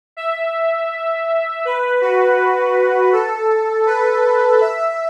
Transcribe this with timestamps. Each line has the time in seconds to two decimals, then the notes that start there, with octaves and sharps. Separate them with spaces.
0.17 E5
1.65 B4
2.01 F#4
3.13 A4
3.86 B4
4.61 E5